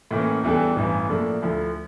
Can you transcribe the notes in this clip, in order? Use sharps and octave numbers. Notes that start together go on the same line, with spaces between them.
A2 E3 A#3 C#4
E2 E3 G3 D4 A4
A1 G2 E3
A2 F3 A#3 D4 A4
D2 D3 F3 A3 E4